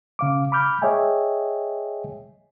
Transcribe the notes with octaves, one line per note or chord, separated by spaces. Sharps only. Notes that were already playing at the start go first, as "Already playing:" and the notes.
C#3 F5 D6
B5 D6 F6 G6
G#4 C#5 D#5 E5 G5 G#5